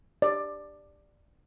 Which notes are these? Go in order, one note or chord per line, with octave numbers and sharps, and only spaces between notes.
D5